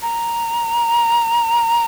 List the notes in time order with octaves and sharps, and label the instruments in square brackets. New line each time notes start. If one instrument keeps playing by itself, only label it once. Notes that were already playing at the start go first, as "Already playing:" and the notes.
[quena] A#5